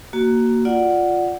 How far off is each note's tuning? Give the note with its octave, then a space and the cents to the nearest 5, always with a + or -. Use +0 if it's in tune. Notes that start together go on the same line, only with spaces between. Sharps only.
A#3 +0 F#4 +15
F4 +5 D5 +0 F#5 +0